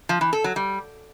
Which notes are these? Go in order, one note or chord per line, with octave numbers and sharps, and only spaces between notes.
F3
E3
A4
F#3
G3